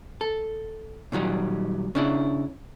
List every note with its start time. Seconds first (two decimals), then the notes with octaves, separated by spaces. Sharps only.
0.21 A4
1.12 A#2 D#3 F#3 G3
1.95 C#3 D4 E4